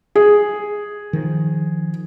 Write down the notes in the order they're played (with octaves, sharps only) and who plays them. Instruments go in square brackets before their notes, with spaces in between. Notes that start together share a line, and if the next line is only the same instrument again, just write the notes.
[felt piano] G#4
[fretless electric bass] D#3 F3